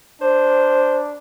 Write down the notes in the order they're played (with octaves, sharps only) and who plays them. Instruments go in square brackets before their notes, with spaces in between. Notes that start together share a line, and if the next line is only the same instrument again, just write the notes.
[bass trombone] D4 [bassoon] C5